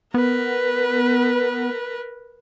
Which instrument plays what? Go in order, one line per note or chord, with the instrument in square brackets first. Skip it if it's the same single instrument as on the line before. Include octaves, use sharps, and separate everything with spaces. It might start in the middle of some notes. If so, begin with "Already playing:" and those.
[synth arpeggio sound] B3 [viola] A#4 B4